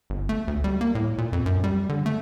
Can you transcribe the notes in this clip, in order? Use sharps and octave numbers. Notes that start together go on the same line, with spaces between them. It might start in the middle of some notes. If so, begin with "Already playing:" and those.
G1
A3
D2
G3
A#3
A2
A#2
F2
F#2
G3
D3
A3